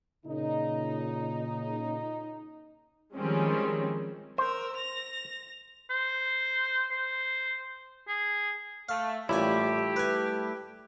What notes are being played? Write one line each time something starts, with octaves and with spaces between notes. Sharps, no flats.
A#2 C#3 D#4
D#3 F3 G3 G#3 C4 C#4
A#4 C5 E6
A#6 F7
C5
C5
G#4
A3 F5
A1 A#2 G3 A3 E4 G4 G#5
B4 G#5